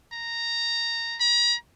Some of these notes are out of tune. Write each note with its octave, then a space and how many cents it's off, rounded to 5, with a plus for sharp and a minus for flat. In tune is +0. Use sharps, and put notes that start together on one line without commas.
A#5 -10
A#5 +40